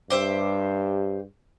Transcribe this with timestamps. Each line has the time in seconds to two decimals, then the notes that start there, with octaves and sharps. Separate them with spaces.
0.10 G2 G4 C5 E5